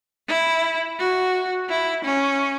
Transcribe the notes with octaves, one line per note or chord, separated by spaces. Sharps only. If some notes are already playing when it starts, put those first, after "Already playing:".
E4
F#4
E4
C#4